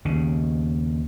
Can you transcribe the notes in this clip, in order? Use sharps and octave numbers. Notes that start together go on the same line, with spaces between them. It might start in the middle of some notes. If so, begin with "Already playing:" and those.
D#2 C#3